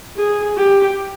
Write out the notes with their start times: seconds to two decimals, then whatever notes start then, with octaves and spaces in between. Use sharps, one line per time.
0.17 G#4
0.58 G4